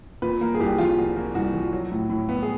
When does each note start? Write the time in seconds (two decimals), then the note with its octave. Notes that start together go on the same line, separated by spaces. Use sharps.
0.22 A#2 B4
0.41 A#3 A#4
0.55 G#4
0.59 C2 G4
0.78 F3 F4
0.97 A#2 F#4
1.16 A#3
1.35 C2 F#4
1.54 F3
1.72 F#3
1.92 A2
2.10 A2
2.29 B3
2.43 G#4